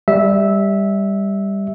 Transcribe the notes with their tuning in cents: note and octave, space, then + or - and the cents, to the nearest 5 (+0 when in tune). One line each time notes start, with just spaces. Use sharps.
G3 +10 E5 -10